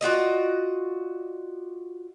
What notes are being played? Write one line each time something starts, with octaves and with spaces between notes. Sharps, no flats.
F4 F#4 D5 D#5